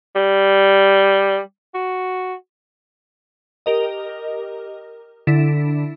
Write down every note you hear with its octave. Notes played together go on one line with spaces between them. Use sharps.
G3
F#4
G4 A#4 D#5
D3 D4 E4